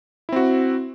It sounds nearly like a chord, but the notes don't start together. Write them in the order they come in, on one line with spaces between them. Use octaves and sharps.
E4 C4 F#4